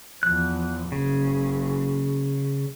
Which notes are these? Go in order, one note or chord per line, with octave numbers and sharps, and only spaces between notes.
E2 F3 F#6
F#1 C#3